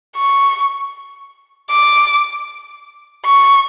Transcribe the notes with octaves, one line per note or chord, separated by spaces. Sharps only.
C#6
D6
C#6